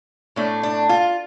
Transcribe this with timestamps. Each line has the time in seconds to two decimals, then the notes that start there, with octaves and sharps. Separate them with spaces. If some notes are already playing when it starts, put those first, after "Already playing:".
0.36 A2 A3 D4
0.63 D4
0.89 F4